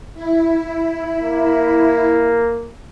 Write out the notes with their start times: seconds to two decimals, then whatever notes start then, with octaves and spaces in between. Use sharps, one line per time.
0.14 E4
1.22 A#3